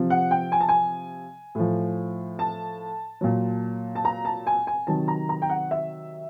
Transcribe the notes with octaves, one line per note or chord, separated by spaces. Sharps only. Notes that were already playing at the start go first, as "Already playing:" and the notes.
Already playing: C3 F3
F#5
G5
G#5
A5
G#5
A2 F3
A5
A#2 F#3
A5
A#5
A5
G#5
G#5
C3 D#3 F#3 A5
A#5
A#5
G5
F#5
E5